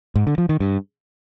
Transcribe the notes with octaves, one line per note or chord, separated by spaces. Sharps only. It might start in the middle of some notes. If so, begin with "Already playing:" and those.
G#2
D3
F3
D#3
G2